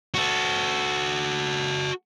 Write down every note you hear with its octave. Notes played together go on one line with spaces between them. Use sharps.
F#4 A4